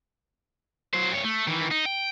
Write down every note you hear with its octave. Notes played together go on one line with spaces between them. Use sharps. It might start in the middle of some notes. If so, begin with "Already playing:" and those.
F#3 C5
G2 C#5
A3
D#3 E3
D#4
G5